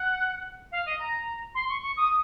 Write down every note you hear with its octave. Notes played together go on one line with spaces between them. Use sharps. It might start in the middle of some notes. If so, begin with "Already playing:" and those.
Already playing: F#5
F5
D#5
A#5
C6
C#6
C#6
D#6